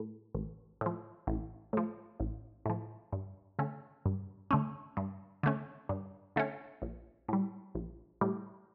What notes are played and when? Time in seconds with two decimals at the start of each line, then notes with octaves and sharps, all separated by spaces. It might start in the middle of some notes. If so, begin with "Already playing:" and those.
Already playing: A2
0.35 A1
0.81 A2 F3
1.27 A1
1.73 A2 F3
2.20 A1
2.66 A2 F3
3.12 G2
3.59 D3 A3 C#4
4.06 G2
4.51 D3 A3 C#4
4.97 G2
5.43 D3 A3 C#4
5.89 G2
6.36 D3 A3 C#4
6.82 A#1
7.28 A2 G3
7.75 A#1
8.21 A2 G3